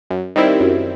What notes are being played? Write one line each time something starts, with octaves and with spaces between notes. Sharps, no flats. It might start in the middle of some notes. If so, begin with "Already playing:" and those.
F#2
D#3 G3 C4 E4
F#2